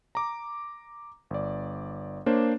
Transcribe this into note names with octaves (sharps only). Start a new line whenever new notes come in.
A#5 D6
G1 D5
A#3 D4 C5 C#5